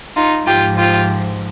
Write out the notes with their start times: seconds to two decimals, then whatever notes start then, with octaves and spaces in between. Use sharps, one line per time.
0.16 D#4 F4
0.47 G#2 F3 F4 G4
0.78 F4 G4